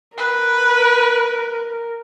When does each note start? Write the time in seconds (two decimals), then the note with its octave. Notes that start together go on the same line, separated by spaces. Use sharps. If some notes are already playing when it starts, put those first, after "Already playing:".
0.18 A#4 B4